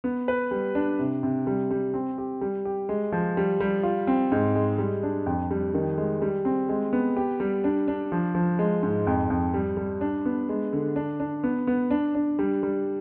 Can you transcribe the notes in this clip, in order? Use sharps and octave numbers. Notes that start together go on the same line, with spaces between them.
B3
B4
G3
D4
C3
C3
G3
G3
C4
G4
G3
G4
G#3
F3
G3
G3
F4
C4
G#2
G#3
G3
D4
F2
G3
D#3
G#3
G3
C4
G#3
B3
G4
G3
D4
D4
F3
F3
G#3
G#2
F2
F2
G3
G3
D4
B3
G#3
D3
D4
D4
B3
B3
D4
D4
G3
G3